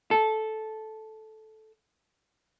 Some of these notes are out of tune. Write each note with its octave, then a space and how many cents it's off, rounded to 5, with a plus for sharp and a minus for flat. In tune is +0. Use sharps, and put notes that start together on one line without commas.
A4 -10